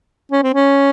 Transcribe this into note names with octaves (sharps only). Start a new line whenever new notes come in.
C#4
C4
C#4